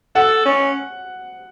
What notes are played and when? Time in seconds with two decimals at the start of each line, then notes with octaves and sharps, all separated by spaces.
0.15 A4 F#5
0.45 C#4